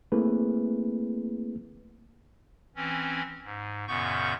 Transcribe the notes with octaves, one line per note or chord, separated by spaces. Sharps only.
A3 A#3 C4 E4 G#4 B4
E3 C4 C#4
G#2
F#2 A#2 C#3 B3 C#6 G6